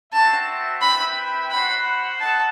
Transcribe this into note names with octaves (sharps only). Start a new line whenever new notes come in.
C4 F#4 C5 E5 A5
C4 E4 B4 E5 G5 B5
F#4 C5 F#5 B5
A4 D#5 F#5 A5